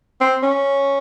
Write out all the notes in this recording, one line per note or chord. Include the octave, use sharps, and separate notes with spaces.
C4
C#4